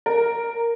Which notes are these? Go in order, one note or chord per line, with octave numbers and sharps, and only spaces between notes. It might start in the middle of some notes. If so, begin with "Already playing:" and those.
A#4